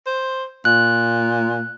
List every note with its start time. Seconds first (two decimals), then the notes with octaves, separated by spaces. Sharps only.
0.06 C5
0.65 A#2 F#6